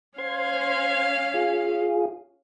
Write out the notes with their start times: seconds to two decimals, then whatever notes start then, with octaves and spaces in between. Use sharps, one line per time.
0.18 C#4 C5 F5 C6 G#6
1.34 F4 G#4